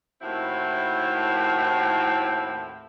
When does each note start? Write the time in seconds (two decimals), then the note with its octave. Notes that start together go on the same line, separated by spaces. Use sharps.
0.22 D#2 A2 C4 E4 F#4